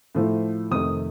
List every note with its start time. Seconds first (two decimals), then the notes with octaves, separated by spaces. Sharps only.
0.15 A2 F3 A3
0.71 F2 C3 D#3 A3 D#6